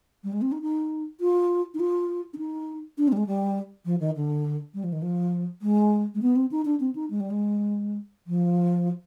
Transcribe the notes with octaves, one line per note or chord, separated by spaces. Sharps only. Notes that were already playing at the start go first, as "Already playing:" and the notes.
G3
G#3
C4
D#4
D#4
F4
D#4
F4
D4
D#4
D4
C4
G3
G#3
G3
F3
D#3
D3
G3
F3
D#3
F3
G#3
G#3
B3
C4
D#4
D4
C4
D#4
G#3
G3
G#3
F3